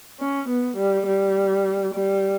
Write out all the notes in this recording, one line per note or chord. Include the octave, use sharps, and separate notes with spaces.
C#4
B3
G3
G3
G3